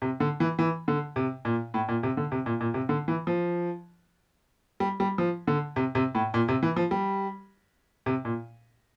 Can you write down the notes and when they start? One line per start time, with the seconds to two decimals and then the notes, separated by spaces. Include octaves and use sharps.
0.02 C3
0.20 D3
0.40 E3
0.59 E3
0.88 D3
1.16 C3
1.45 A#2
1.74 A2
1.88 A#2
2.03 C3
2.17 D3
2.32 C3
2.46 A#2
2.61 A#2
2.74 C3
2.89 D3
3.08 E3
3.27 F3
4.80 G3
5.00 G3
5.18 F3
5.47 D3
5.76 C3
5.95 C3
6.15 A2
6.34 A#2
6.48 C3
6.63 E3
6.76 F3
6.91 G3
8.06 C3
8.25 A#2